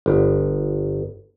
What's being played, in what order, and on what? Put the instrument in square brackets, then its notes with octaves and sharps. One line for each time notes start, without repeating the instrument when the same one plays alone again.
[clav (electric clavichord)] G1